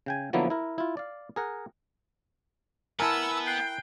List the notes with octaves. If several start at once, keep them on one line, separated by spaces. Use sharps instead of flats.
C#3 G5 G#5
D3 F3 F#3 A#3 B3 E4
E4 A#4
E4 F4
D5 F5
G#4 A#4 F#5
B3 E4 A#4 B4 G#5 A5 E6
G5 F#6 C7 G7